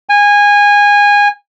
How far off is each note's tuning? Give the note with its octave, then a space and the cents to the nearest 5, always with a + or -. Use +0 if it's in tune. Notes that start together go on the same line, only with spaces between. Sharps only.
G#5 -20